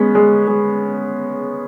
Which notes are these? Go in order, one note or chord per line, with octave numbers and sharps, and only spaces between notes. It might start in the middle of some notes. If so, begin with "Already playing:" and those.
Already playing: G#3 B3 C#4
G#3
G#3